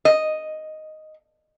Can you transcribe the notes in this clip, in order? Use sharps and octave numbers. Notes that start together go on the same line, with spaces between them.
D#5